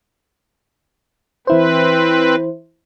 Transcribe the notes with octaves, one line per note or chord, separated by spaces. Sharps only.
E3 C4 E4 B4 C5